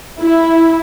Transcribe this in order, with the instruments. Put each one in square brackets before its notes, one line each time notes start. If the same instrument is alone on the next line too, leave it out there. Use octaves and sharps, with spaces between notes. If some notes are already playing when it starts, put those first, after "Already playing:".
[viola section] E4